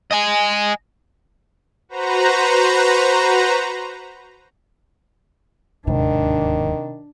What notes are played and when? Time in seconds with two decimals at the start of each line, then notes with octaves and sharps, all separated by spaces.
0.12 D#5 G#5
1.89 F#4 B4 C5 A#5
5.87 D1 D#2 G#2 C3 D#3 D4